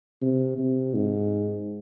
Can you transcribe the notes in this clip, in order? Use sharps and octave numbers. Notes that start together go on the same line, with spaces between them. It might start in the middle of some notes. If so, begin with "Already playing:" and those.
C3
C3
G#2